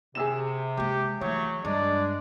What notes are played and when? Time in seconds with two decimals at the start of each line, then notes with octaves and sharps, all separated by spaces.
0.15 C3 G#4 E6 E7
0.77 G#3 A#3 G4
1.21 E3 F#3 A3 C#5
1.65 G2 G#3 D4 D5